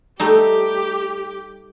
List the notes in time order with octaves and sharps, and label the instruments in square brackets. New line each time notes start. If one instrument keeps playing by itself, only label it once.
[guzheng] G3 A3 D#4 [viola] G4